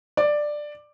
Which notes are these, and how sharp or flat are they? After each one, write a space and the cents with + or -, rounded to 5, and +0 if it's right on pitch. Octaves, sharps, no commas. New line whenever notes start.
D5 +10